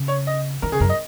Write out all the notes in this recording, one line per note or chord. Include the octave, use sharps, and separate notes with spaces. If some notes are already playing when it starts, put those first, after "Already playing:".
Already playing: C#3
C#5
D#5
D#3 A#4
C#3 G#4
F#2 A#4
D#5